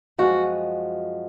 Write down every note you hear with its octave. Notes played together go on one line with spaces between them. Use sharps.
F#2 F3 G#3 F#4